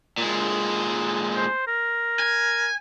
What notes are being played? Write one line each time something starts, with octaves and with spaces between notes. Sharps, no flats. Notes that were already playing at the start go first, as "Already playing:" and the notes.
A#2 G#3
C5
A#4
G#5